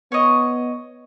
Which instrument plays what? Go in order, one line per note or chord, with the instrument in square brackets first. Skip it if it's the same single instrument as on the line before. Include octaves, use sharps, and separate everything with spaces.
[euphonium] B3 [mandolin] C#5 D#5